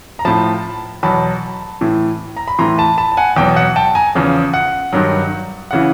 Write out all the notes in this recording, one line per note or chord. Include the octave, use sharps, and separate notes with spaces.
A#5
A2 F3 A5 B5
E2 B2 F#3 A5 B5
A2 E3
A#5
B5
A2 E3 A#5 C6
A5 B5
A5 B5
A5
F#5 G#5
E2 B2 F#3 G5
F#5
G5 A5
G#5 A#5
E2 C#3 F3
F#5
G2 D#3 F#3
C#3 E3 F#5